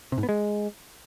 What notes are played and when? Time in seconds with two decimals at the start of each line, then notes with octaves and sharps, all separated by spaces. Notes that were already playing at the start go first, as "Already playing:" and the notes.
0.12 C3
0.18 G#2
0.23 B3
0.29 G#3